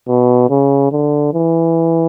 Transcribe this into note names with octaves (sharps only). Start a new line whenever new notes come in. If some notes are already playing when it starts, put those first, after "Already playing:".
B2
C#3
D3
E3